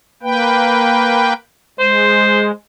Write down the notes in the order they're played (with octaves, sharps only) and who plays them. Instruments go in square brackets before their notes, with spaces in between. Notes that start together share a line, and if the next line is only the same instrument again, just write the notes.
[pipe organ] A#3 B4 G5
[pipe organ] G#3 [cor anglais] C5